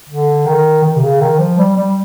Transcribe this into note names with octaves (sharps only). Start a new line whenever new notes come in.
D3
D#3
D#3
C3
C#3
D#3
F3
G3
G3